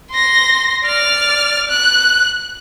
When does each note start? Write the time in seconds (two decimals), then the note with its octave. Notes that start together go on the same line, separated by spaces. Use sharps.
0.11 C6 A#6
0.86 D5 F6
1.69 F#6